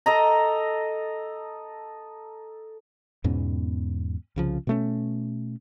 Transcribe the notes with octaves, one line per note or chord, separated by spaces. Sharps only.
A4 D#5 A#5
E2 G#2 B2 C#4
C2 C#3 F3
B2 A3 C#4